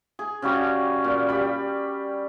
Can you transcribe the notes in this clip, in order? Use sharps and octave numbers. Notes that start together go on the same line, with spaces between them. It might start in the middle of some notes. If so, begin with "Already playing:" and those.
G#4
C#3 G3 F#4 G4
A#2
G3 B5